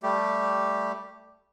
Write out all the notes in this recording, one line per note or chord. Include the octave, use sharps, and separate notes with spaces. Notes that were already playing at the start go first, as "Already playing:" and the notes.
G3 A3 G4